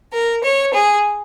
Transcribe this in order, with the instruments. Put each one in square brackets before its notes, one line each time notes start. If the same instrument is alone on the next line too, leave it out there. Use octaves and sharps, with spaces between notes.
[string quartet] A#4
C#5
G#4